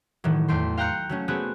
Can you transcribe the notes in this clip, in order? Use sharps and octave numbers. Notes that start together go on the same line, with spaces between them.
A2 D#3 E3 F#3
E2 A3 G5 C6
F5 G5 A#5 F#6 G6 C#7
F#3 A3 C#4
A3 B3 C4 F#4 G#4